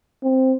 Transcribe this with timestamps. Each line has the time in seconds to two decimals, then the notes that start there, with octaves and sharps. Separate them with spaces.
0.23 C4